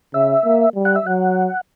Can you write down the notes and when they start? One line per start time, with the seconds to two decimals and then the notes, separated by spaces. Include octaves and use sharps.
0.14 C#3 E5
0.44 A#3
0.75 G3
0.85 F#5
0.96 E5
1.06 F#3 F#5